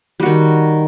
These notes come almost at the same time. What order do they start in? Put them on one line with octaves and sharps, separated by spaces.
G3 F#4 D#3